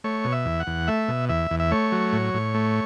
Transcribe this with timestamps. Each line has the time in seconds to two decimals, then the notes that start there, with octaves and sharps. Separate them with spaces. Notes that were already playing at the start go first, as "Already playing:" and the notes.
0.04 A3 C#5
0.25 B2
0.32 E5
0.46 E2
0.60 F#5
0.67 E2
0.88 A3 E5
1.08 B2
1.29 E2 E5
1.51 E2
1.60 E5
1.71 A3 C#5
1.92 F#3
2.13 A2
2.34 A2
2.54 A3